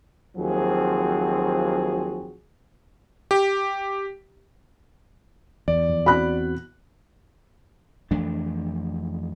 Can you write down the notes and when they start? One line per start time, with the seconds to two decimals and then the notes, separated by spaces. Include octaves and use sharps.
0.37 D#2 F3 F#3 C4 F#4 G#4
3.31 G4
5.68 E2 D5
5.89 F2
6.06 C4 F#4 B5 F#6
8.11 F2 E3 A3 D4